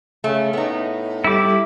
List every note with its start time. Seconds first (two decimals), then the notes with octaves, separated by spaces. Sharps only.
0.24 C#3 A3
0.53 A2 B3 D#4
1.24 G3 E4 G4 A4 D6